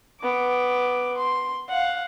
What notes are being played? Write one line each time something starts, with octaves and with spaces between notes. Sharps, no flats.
B3 D6
C6
F5 F#5